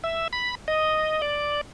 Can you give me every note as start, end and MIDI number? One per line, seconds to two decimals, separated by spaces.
0.04 0.28 76
0.33 0.55 83
0.68 1.21 75
1.22 1.61 74